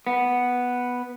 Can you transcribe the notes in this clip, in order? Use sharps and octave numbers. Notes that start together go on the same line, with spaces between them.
B3